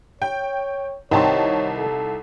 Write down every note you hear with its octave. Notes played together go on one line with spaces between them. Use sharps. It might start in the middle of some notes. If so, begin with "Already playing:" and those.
C#5 G5
C2 D#3 C4 D#4 C#5 A5
A4